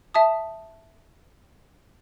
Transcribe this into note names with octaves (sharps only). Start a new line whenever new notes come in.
E5 A5 D#6